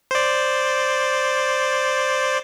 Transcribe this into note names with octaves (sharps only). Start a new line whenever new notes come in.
C5 D5